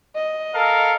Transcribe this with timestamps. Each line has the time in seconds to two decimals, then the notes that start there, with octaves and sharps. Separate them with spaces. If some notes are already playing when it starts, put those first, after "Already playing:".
0.15 D#5
0.54 A4 A#4 F5